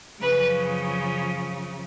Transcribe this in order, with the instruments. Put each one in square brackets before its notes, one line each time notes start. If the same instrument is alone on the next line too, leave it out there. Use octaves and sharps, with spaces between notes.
[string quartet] F#2 C#3 F3 B4